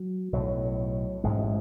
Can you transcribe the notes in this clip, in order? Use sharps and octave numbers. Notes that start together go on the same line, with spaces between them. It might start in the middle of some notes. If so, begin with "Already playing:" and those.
Already playing: F#3
B1 A2 F#3
A1 G#2 G#3